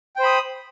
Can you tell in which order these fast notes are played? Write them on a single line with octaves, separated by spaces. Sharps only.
G5 C5 B5 D#6